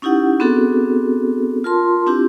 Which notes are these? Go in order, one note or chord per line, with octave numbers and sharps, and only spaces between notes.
C#4 D#4 E4 G4 F#5
B3 C4 D4 F#4 G#4 A4
F4 A#4 A5 C6
C4 D4 E4 F4 G4